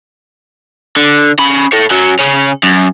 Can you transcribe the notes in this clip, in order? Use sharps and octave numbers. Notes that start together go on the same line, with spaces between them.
D3
C#4 B5
A4 C#5
F#2 F#3
C#3 C#4
F#2